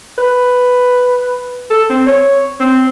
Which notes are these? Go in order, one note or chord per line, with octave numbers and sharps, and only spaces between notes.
B4
A4
C4
C#5
C4